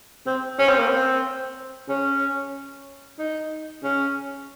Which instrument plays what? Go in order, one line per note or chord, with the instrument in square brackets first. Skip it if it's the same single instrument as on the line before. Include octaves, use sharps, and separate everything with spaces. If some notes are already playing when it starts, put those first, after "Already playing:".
[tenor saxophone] C4
C#4
C4
A#3
C4
C#4
D#4
C#4